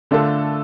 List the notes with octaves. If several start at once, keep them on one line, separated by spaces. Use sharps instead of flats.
D3 A3 D4 F4 A4